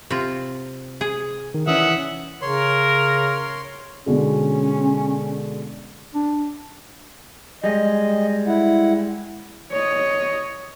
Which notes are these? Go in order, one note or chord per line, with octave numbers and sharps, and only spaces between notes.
C3 F4
G#4
D#3
E3 C#4 E5 F#5 D#6
C#3 A#4 C#5 C6
B2 D3 G#3 C#4
D4
G3 G#3 D#5
E4 F#5
C#5 D#5